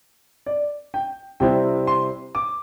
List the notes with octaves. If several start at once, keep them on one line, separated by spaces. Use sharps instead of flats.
D5
G5
C3 G3 C4 E4 G5
C6
D6